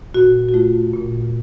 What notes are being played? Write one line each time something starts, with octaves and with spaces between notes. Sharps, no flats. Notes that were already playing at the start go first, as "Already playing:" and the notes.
A#2 F#4
F#4
A3 F4
A#2